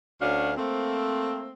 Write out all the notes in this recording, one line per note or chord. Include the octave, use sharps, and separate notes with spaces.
D2 C#4 D4 F#4 F5
A3 A#3 C4